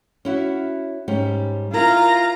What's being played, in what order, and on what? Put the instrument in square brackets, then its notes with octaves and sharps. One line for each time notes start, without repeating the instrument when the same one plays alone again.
[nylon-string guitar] C#4 E4 F#4
G#2 G3 C#4
[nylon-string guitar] E4 A#4 [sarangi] F4 [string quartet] A#5